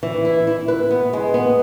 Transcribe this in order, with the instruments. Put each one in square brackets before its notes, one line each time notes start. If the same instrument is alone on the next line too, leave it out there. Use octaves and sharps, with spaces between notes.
[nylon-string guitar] E3
E4
E4
B4
B3
G#3
B3